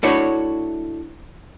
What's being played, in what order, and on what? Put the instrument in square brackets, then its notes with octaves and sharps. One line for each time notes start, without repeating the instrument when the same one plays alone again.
[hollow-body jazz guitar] A3 D4 E4 F#4 C#5